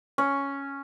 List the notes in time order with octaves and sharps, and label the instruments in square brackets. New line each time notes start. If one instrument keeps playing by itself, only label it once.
[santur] C#4